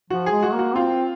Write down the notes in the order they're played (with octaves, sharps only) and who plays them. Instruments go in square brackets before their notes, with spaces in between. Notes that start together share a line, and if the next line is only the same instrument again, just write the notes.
[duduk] F3 [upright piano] F#4
[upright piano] G#4
[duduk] G#3
[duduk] G#3 [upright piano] F#4
[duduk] A#3
[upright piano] F#4
[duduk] C4 [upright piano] F4